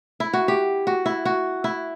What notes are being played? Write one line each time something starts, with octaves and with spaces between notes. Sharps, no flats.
E4
F#4
G4
F#4
E4
F#4
E4